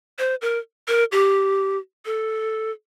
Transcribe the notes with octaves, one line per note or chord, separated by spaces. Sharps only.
C5
A#4
A#4
G4
A4